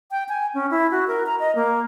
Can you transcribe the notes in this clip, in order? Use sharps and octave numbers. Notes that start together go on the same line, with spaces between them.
G5
G#5
C#4
E4
F#4
A#4
A#5
D#5
A#3